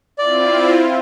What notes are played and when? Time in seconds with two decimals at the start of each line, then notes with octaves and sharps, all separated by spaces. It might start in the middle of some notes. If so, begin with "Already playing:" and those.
0.18 C4 E4 F4 D5